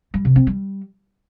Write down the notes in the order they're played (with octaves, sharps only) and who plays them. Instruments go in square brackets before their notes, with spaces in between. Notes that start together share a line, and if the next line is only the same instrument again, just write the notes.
[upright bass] G3
C3
C4
G3